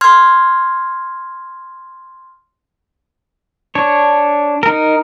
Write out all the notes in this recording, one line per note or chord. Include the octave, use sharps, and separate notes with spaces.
C6 F6 G#6
D4 C#5
D#4 A#4